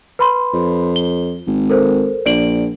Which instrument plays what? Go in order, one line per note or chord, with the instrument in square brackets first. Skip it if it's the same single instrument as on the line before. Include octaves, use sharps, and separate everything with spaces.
[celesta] B4 B5 C6
[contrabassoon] F2
[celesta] G7
[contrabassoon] G#1
[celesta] A4 A#4 C5
[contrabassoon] A#1 [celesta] D5 D7 F#7